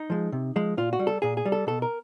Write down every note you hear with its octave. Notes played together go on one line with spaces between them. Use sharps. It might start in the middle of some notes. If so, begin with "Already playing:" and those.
Already playing: D#4
F3 G#3
C3
F3 G#3
A#2 F4
F#4
G3
A4
A#2 G#4
G#4
G3
A4
B2 A4
A#4